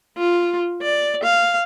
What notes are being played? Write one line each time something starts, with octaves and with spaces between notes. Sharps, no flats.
F4
D5
F5